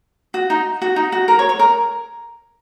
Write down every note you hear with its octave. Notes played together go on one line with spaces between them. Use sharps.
F#4
D#4
F#4
D#4
F#4
A#4
C#5
C#5
A#4